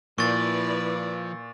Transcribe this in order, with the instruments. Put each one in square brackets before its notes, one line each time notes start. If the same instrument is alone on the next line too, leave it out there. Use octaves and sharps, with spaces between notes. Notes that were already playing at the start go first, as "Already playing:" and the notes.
[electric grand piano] A#2 [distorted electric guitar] F3 [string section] E4 B4 D5 [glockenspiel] C#6 A6